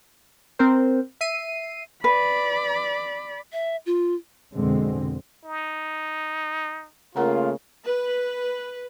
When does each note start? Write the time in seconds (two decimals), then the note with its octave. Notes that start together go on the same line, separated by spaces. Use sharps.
0.59 C4 A#4 C5
1.21 E5 C7 D#7
2.04 B4 D5 B5
3.52 E5
3.86 F4
4.55 F2 B2 D3 G#3 C4
5.45 D#4
7.16 C#3 A3 A#3 F4 A#4 F#5 A#5
7.85 B4